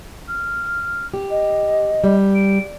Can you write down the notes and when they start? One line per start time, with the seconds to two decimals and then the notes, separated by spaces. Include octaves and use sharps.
0.28 F6
1.14 G4
1.30 D#5
2.04 G3
2.35 D7